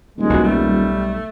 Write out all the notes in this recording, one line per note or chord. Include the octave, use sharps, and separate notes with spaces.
D#1 G#3
B1 F#4
G3 A3